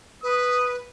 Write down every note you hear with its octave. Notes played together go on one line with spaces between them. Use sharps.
B4 D#6